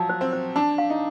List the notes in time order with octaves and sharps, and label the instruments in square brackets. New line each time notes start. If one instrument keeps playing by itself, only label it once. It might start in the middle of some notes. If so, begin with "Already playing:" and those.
Already playing: [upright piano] F3 F#3 [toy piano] A5
[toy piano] C5
[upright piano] C4
[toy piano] C5
[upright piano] D4 [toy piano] A5
[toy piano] F5
[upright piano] D#4